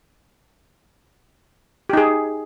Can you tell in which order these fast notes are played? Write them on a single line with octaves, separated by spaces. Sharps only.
G4 D#4 G#4